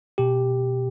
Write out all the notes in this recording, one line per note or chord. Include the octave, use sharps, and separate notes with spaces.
B2 G4